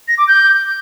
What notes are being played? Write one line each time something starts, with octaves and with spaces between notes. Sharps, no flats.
A#6
D6
G6